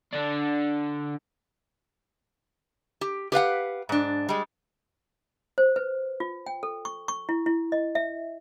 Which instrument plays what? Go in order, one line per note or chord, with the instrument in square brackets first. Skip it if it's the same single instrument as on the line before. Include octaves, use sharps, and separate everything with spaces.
[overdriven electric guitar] D3 D4
[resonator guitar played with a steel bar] G4
G4 B4 F5 F#5
G#2 D4
G3 G#3
[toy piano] C5
B4
F4
G5
A4
C#6
C#6
E4
E4
D#5
E5